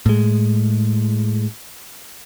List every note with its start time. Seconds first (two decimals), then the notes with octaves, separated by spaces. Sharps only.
0.06 A2 G#3